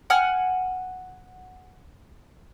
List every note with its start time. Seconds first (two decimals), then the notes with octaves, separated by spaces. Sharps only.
0.10 F#5 G#5 F6